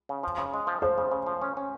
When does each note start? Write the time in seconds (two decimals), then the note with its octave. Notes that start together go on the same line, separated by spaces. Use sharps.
0.09 C#3
0.23 F3
0.38 C#3
0.54 G#3
0.67 F3
0.82 F3 C5
0.98 C#3
1.11 C#3
1.26 F3
1.42 C#4
1.57 C#4